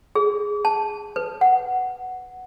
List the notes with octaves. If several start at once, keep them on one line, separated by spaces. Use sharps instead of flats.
G#4
A5
B4
F#5